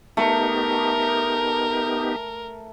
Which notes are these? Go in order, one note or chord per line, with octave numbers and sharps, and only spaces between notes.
A3 B3 D#4 G4 A#4